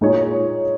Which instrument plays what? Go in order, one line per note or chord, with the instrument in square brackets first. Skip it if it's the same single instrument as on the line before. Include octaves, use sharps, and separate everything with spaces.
[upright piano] A#2 G#3 D#4 G#4 C#5